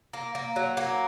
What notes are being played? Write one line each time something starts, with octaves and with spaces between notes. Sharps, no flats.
A#3
A#3
F#3
A#3